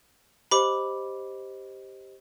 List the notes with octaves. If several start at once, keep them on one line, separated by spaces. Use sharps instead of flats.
G4 C5 D#5 B5 D6